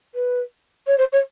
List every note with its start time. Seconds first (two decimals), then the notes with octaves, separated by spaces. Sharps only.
0.15 B4
0.87 C#5
0.98 C5
1.12 C#5